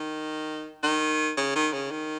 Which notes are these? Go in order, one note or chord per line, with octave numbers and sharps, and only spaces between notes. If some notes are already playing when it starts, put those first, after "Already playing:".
Already playing: D#3
D#3
C#3
D#3
C#3
D#3